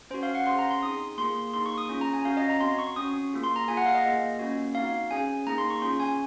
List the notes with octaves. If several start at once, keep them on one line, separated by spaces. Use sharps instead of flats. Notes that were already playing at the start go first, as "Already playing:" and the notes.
C#4 F#4 C5
F5
F#5
C#4 G#4 C6
A#5
C6
C4 D#4 G#4 D#6
A#3 F4 G#4 C6
A#3 D#4 G#4 C6
C#6
D#6
C#4 F4 G#4
A#5
G#5
C#4 F#4 F5
D#5
A#5
C4 F#4 C6
C#6
C#4 F#4 D#6
A#3 F4 G#4
C6
A#5
A#3 F4 G#4 G#5
F#5
F5
D#5
A#3 F4 G#4
A#3 C#4 F#4
C4 D#4 F#4 F5
C#4 G#4 G#5
A#3 D#4 G#4 A#5
C6
C#6
C#4 F4 G#4 C6
G#5